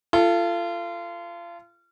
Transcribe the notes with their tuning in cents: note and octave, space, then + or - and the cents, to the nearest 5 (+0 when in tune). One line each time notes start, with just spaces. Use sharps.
F4 -30 A4 +10